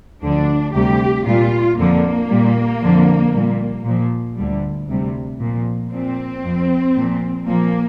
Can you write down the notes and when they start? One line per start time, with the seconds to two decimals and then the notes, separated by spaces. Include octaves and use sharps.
0.22 D2 D3 F3 D4
0.74 D2 C3 G3 G4
1.26 A#2 G3 F4
1.78 F2 D3 F3 A#3
2.29 A#2 G3
2.81 F2 D3 F3
3.33 A#2 G3
3.85 A#2 F3
4.36 D2 D3 G3
4.88 D2 C3 G3
5.40 A#2 F3
5.92 A#2 F3 C4
6.44 F2 F3
6.95 A#2 F3
7.46 A#2 F3 A#3